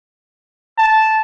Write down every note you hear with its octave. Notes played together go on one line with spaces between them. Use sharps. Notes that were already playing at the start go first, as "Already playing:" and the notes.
A5